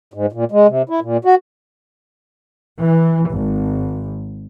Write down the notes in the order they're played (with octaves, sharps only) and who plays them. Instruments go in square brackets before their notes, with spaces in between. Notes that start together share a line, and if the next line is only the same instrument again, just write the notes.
[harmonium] G#2
A#2
G#3
C3
E4
A#2
F#4
[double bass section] E3
G#1